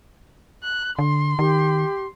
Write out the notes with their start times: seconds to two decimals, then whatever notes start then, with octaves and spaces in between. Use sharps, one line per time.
0.63 F#6
0.99 D3 C6
1.39 D#3 G4